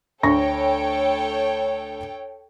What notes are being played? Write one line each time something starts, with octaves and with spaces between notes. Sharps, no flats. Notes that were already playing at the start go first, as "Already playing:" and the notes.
D2 A4 C#5 G5 C#6 A#6